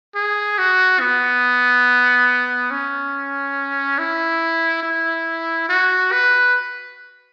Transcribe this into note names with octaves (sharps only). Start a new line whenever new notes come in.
G#4
F#4
B3
C#4
E4
E4
F#4
B4